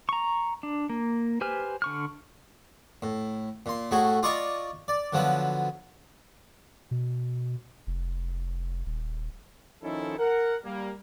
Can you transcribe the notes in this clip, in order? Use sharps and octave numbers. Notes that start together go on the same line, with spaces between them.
A#5 C#6
D4
A#3
G4 B4 C5 G#5 F6
D3 C#6 F6
A2
A#2 C6
A2 A3 F#4 G#4
F4 D5 D#5 A#5 C#6 D#6
D5
D3 F3 F#3 B3
B2
F1
D#1
D#3 F3 C#4 D#4 E4 A4
A#4 F#5
G3 A#3